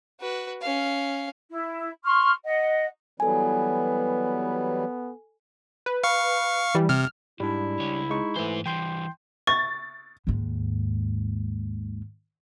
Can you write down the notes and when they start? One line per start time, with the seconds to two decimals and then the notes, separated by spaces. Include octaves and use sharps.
0.20 F#4 B4
0.61 C#4 F5
1.50 E4
2.04 C6 C#6 F6
2.45 D#5 F#5
3.20 E3 F#3 G3 B3 A4 G#5
5.86 B4
6.04 F5 C#6
6.75 E3 G3
6.89 C3 F6
7.40 G#2 G3 D4 E4
7.80 C#2 C#5
8.10 G#3 D#4 C#6
8.36 G#2 E3 A3 C5
8.66 E3 G3 G5 C6 G6
9.47 C#6 A6
10.27 D#2 G#2